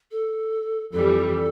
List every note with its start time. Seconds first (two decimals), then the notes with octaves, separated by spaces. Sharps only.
0.11 A4
0.92 F2 E3 G3 A4